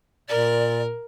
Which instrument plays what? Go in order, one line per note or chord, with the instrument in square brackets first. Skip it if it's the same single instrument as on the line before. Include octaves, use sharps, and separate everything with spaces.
[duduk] A#2 [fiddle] A#4 [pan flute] D5